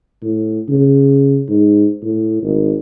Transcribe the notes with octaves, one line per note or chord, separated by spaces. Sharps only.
A2
C#3
G#2
A2
G#1